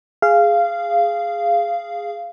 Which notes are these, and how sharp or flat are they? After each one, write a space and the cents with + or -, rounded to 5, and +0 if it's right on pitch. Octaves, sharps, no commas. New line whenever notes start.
G#4 +0 F5 -15